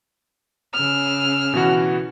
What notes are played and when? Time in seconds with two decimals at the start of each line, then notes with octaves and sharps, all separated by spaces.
0.75 C#3 E6 F6
1.54 B2 E3 F#4